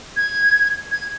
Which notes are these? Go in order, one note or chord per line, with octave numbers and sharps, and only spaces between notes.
G#6
G#6